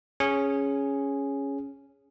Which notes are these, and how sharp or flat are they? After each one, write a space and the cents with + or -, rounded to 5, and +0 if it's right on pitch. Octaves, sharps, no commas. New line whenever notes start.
C#4 +0 G#4 +0